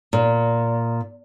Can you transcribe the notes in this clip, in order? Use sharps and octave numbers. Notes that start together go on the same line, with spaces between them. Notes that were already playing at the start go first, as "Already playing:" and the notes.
A#2